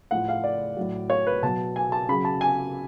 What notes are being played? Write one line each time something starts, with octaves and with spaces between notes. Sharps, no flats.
A2 F3 F#5
F5
D5
A2 F#3
C#5
B4
B2 F#3 A5
G#5
A5
C#3 F#3 B5
A5
G#5